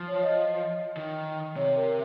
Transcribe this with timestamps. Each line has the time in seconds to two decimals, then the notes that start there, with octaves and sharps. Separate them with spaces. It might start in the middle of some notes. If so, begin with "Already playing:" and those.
Already playing: F3
0.08 C#5
0.23 D#5
0.97 D#3
1.56 C3 C#5
1.76 A#4